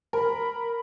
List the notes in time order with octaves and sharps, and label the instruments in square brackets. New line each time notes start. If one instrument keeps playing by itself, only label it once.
[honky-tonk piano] A#4 [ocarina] B5